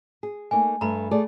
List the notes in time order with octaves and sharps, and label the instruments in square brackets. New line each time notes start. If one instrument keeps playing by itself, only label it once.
[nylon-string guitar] G#4
[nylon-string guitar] A3 A#3 D#4 [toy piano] G#5
[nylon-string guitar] G2 A3 [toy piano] A#5 B5
[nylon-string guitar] A3 G#4 D5